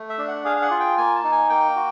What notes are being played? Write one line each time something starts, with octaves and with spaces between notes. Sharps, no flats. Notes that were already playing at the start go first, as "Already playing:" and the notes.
Already playing: A3
E5
D4
F#5
G#4 F5
F5
F#5
F4
G5
A#3 G#5
A5
D#4
G#5
A#3 G5
F#4